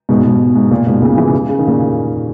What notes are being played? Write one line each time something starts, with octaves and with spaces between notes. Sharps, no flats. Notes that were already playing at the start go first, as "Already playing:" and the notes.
G#2 B2
G#2 B2
G#2
A#2
G#2 B2
A#2 C#3
C#3 E3
C#3
D#3
A#2 C#3